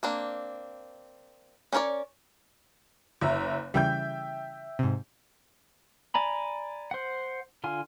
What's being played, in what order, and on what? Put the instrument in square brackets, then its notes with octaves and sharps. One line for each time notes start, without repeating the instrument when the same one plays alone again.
[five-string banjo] A#3 C4 D4
C#4 D4 A#4 C#5 D5
[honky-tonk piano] F#1 E5 A#5
[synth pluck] C#3 E3 G3 [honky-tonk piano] E5 G5 G6
[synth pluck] G#2 C3
[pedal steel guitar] D5 G#5 A#5 B5
C5 F#5
D3 F4 G#5